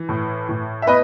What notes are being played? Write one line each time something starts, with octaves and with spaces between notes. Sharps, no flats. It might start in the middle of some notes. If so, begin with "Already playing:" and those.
Already playing: E3
A2
A2
E5
B3 B4 D#5